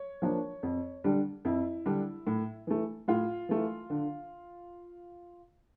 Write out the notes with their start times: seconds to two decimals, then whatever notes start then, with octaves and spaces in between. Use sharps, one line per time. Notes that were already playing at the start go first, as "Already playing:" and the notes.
Already playing: C#5
0.22 F3 A#3 D4
0.63 F2
1.04 D3 G3 D4
1.45 F2 E4
1.86 D3 G3 D4
2.27 A2
2.67 E3 A3
3.08 A2 F4
3.49 E3 A3
3.90 D3